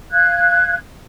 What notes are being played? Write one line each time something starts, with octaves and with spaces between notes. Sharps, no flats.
F5 F#6 G#6